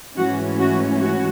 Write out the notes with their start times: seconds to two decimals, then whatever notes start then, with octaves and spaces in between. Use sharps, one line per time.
0.17 G#2 E3 A3 C#4 F#4
0.59 F#4
1.01 F#4